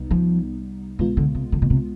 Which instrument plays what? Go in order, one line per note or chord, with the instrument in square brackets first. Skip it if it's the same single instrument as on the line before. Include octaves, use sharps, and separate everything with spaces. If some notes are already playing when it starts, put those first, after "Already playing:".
Already playing: [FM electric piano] C2 C3 G3 B3 D#4
[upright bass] F3
[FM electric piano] C2 B2 G#3 B3 F4 [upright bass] D#3
[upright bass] D3
C3
D3
B2
C3